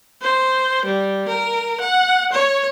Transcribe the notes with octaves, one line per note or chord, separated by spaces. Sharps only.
C5
G3
A#4
F#5
C#5